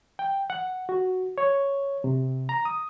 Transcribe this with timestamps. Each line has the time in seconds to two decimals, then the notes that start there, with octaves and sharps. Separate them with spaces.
0.19 G5
0.50 F#5
0.89 F#4
1.38 C#5
2.04 C3
2.49 A#5
2.65 D#6